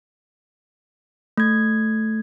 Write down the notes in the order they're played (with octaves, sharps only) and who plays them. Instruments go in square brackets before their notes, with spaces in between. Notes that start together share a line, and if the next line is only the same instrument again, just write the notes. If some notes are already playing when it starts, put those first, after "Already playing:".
[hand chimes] A3 G#6